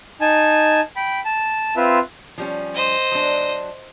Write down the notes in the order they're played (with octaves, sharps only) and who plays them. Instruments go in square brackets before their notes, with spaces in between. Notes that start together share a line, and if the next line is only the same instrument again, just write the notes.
[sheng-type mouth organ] D#4 G#5 A5
G5 B5
A5
C4 F4 B4 E5
[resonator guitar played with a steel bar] F3 G3 C#4
[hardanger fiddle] C5 D#5
[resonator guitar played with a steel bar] F#3 D4